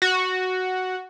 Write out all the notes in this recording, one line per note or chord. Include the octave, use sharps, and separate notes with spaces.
F#4